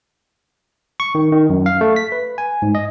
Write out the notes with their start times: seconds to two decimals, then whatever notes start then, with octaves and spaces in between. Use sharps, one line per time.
1.00 C#6
1.15 D#3
1.32 D#3
1.50 F#2
1.66 F5
1.81 A3
1.96 B6
2.12 B4
2.38 G#5
2.62 G#2
2.75 D#5